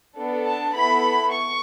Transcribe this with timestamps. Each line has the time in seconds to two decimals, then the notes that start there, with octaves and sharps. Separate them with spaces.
0.17 B3 D4 A4
0.47 A5
0.75 B3 E4 A4 B5
1.33 C#6